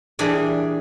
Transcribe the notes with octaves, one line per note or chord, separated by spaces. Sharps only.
A#2 E3 G3 D4 G#4 D5